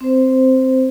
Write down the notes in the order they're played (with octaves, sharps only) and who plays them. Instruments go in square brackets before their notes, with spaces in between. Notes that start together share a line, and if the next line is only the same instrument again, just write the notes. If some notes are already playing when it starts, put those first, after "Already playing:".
[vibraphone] C4 C5